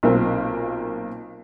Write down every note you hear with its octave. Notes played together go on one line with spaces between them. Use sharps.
B1 A#2 A#3 C4